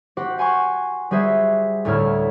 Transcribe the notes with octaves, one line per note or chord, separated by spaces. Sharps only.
F#4 G4 C5 F#5
F#5 G#5 C6 C#6
G3 F#4 G#4 C5 E5
D2 A2 E4 C#5 F6